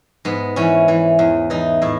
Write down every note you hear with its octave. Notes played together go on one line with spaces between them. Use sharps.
G#2 B3
E3 C#4
E3
E2
E3 D#4
A2 E4